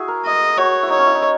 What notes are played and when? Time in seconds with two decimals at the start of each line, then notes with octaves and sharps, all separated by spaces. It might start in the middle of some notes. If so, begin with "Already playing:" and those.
Already playing: E4 F#4 G#4
0.08 A#4
0.25 D#5
0.58 F#4 C#5
0.83 E4
0.90 D#4 C#5
0.98 C#4
1.07 E4
1.15 D#4